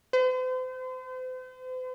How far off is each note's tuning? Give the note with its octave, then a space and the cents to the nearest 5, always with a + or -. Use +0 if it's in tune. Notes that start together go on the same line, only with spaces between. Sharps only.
C5 -40